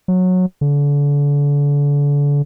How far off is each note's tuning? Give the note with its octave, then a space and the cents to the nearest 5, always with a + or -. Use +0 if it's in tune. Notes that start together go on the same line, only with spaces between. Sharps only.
F#3 -15
D3 -35